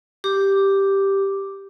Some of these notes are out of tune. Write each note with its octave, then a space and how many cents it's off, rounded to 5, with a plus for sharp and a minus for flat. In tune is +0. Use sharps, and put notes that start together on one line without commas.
G4 +0 D6 +0